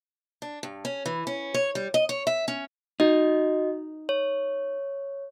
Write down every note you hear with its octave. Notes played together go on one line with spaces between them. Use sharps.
D4
G2
C#4
E3
C#4
C#5
G3
D#5
C#5
E5
C#4
D#4 F#4 D#5
C#5